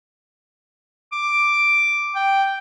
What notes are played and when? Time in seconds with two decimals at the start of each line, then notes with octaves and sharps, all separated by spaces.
1.12 D6
2.15 G5